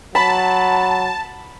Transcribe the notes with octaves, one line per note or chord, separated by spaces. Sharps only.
F#3 A5 B5